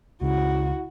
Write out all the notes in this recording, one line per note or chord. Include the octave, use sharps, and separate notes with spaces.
C#2 C#3 E4 F#4